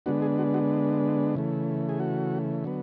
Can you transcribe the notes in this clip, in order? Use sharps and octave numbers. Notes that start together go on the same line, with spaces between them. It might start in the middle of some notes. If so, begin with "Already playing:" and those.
D3 G#3 B3 D4 F#4
G#4
F#4
F#4
C#3 E3 A3
G#4
F#4
D3 F#3 B3